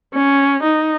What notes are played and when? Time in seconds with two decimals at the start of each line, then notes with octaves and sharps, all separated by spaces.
0.14 C#4
0.63 D#4